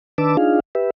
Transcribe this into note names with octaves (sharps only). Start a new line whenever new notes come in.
D#3 D4 B4 A5 D6 E6
D4 D#4 F4 G#4 F5
G4 B4 E5